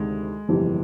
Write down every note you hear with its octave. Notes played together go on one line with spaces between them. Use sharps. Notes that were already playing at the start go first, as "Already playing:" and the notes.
Already playing: D2 C3 D#3 G#3
G1 F2 C3 E3